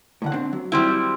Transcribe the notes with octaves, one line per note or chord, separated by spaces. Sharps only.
A2 D3 F#5
C4 D4
F#3
G3 C4 E4